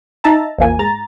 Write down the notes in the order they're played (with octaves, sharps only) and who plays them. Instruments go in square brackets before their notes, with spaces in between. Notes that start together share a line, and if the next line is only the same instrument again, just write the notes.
[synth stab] D#4 E5 A5 A#5
A1 E2 F3 A#3 G#5
G#2 A#5 A6